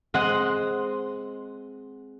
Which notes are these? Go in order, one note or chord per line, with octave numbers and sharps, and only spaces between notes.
G#3 C4 D#5 F#5